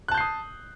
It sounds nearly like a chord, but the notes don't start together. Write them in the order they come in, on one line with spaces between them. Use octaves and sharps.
F#6 A5 G6 C7 D#6